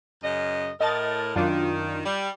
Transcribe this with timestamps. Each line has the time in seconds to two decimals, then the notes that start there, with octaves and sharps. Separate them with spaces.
0.23 F#2 C#3 D#5
0.81 A2 A#4 D#5 A5 A6
1.36 F#2 D#3 D4 F4
2.04 G3